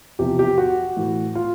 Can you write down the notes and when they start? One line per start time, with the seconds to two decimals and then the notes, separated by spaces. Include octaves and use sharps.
0.19 E2 C3 F3 G4
0.39 G4
0.58 F#4
0.97 A2 E3
1.35 F4